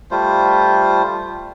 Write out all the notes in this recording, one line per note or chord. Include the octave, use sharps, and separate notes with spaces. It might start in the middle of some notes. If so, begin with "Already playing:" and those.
G3 A3 F4 C5